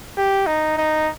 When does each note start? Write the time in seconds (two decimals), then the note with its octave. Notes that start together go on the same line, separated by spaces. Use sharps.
0.17 G4
0.47 D#4
0.77 D#4